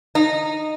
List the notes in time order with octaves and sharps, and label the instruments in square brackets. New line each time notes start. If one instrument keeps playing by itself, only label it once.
[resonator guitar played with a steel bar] D#4